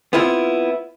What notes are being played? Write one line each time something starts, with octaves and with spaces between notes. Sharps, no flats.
B3 C4 E4 F4